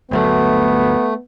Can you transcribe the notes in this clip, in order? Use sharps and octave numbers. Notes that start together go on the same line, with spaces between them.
G1 D2 F#3 A3 B3